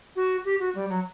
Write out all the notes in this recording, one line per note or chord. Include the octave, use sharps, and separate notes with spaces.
F#4
G4
F#4
G3
F#3